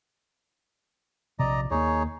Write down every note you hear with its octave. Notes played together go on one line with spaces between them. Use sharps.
A#1 C3 D5 D#5 A#5
D#2 A#3 D#4 G#4 C#5